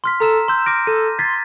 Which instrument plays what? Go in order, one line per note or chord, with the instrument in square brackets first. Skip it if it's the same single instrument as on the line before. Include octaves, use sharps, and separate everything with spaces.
[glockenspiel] C6 F6 B6
[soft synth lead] A4 [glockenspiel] A#5 E6 E7
[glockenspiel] C6 G6 [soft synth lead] E6
[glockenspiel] D6 F6 A#6 [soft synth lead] D7
[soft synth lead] A4 [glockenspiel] D#7
[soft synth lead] C6 [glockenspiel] G#6 A6 B6